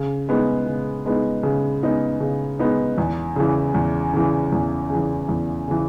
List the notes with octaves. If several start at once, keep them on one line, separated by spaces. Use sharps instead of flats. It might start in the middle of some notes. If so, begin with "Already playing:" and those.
Already playing: C#3
G#3 B3 D#4
C#3
G#3 B3 D#4
C#3
G#3 B3 D#4
C#3
G#3 B3 D#4
E2
C#3 E3
E2
C#3 E3
E2
C#3 E3
E2
C#3 E3